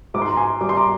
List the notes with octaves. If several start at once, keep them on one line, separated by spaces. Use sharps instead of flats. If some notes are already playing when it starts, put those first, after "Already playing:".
G#2 D6
C6
A#5
G#5 C6
G3 D6
C6
A#5 D6